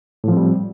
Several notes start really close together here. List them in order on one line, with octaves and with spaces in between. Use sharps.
A2 F3 C4 G3